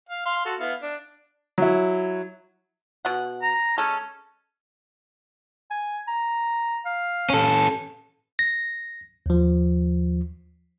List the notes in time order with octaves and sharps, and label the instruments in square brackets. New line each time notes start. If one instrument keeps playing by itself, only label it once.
[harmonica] F5
F5 C6
F#4 A4
B3 E4 F5
D4
[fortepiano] F#3 E4
[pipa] B2 F#5
[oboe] A#5
[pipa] G#3 A4 [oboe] C#4
[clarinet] G#5
A#5
F5
[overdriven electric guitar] C#4 A4
[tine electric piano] A#6
D#2 F3